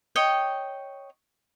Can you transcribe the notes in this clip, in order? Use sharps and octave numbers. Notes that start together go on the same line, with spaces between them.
C#5 D#5 G5